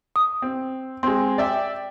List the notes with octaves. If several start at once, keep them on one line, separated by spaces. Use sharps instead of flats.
D#6
C4
G#3 C4 C6
D5 E5 G5